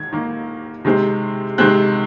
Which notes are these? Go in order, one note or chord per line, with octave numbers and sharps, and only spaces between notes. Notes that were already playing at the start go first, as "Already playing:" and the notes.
Already playing: D#3 G#6
D#3 A#3
C3 D#3 G#3 C4
C3 D#3 G#3 C4 F#6